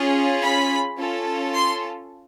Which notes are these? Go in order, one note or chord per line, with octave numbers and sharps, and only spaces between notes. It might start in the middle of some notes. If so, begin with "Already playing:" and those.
Already playing: C#4 F4 G#4
B5
C#4 F4 A4
C6